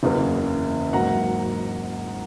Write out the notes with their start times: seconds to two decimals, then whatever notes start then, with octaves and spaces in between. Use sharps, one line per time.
0.03 F#1 E2 C#3 E3 A#3
0.93 G#1 G#2 F#3 A#3 F#5 A#5